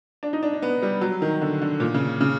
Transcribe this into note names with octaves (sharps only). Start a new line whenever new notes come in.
D4
D#4
D4
D4
B3
G3
F#3
D#3
D3
D3
A#2
C#3
C#3